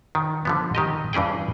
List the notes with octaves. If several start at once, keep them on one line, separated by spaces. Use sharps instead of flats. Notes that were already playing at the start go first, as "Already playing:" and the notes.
D#3
D3 F3 B3
D#3 G4 D#5
G2 E3 C#4 G#4 G5